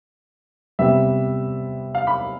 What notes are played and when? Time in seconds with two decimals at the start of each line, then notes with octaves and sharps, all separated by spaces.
0.79 C3 G3 B3 E5
1.95 F5
2.07 B5